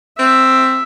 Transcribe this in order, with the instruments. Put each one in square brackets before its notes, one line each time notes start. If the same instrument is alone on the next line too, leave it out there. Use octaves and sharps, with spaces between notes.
[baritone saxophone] C4 [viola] E5